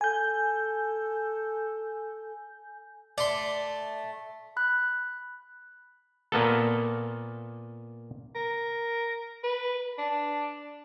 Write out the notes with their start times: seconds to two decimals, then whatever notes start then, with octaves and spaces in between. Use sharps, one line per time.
0.01 A4 G#5 G6
3.18 A3 D5 C6
4.57 B5 F#6
6.32 A#2 A#3 B3 A4
8.35 A#4
9.44 B4
9.98 D4